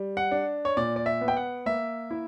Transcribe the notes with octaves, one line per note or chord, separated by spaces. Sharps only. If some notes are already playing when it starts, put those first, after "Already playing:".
Already playing: G3
F#5
D4
C#5
A#2 D5
D5
E5
B3
G5
F#5
A#3 E5
E4